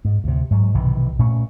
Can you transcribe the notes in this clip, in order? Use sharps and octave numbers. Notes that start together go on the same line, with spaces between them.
G#2
D2 C3
G#2 F#3
B1 C3 D#3 E3
A#2 A3 C#4